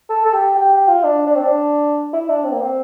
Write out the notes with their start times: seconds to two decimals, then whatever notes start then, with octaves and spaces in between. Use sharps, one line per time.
0.10 A4
0.25 A4
0.33 G4
0.57 G4
0.72 G4
0.88 F4
1.04 D4
1.27 D4
1.35 C4
1.43 D4
2.13 E4
2.29 D4
2.44 C4
2.52 A#3
2.61 C4